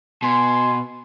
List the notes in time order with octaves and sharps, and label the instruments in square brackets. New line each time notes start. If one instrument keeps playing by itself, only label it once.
[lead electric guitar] B2 [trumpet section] G#5 C6